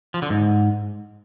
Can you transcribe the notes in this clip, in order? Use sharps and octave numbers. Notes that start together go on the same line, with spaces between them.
F3
D3
G#2